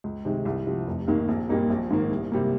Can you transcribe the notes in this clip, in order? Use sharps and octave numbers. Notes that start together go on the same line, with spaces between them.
C#2
C3 D#3 G#3
C2
C3 F3
F1
D#2 D#3 A#3
A#1
A#2 G3 A#3 D#4
A#1
G#2 D#3 A#3
C2
C3 G3 A#3